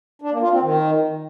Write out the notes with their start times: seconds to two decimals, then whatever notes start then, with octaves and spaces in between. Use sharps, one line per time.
0.22 D4
0.32 A#3
0.42 F4
0.52 C4
0.62 D#3